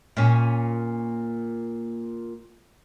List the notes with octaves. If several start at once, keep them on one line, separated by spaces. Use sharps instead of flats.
A#2 C#4